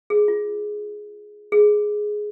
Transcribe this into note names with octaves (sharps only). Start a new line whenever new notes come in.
G#4
F4
G#4